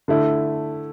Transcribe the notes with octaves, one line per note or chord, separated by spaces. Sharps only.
D3 A3 E4